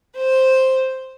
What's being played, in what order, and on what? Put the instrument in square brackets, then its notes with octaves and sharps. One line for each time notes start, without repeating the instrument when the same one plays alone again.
[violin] C5